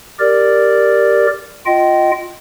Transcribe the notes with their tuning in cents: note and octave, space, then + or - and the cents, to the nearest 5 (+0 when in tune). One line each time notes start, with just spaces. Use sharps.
G4 +0 A#4 -5 D5 +0
F4 +0 D#5 +0 G5 -30